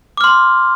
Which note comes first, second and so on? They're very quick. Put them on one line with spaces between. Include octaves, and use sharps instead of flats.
D6 F6 C6